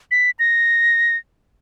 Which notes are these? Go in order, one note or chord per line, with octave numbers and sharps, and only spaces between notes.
B6
A#6